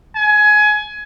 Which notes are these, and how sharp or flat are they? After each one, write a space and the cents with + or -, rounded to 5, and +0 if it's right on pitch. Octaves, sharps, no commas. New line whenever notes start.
G#5 +20